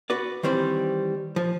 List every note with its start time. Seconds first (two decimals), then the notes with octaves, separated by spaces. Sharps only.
0.10 F#4 B4 D5
0.43 D#3 E3 G3 C4 C5
1.36 F3